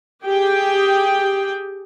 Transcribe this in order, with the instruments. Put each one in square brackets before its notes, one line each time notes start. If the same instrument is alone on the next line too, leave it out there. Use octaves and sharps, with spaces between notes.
[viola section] G4 G#4 G5